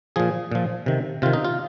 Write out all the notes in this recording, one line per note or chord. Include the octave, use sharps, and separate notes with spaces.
A#2 F3 G#4
A#2 F3
C3 D#3
C3 D#3 F4
D#4
F4